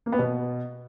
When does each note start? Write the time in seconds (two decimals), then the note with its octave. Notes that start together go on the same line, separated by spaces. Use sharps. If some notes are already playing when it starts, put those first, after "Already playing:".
0.06 A#3
0.12 B3
0.19 B2